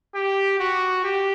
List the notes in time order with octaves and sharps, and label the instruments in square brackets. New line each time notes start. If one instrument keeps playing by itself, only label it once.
[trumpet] G4
F#4
G4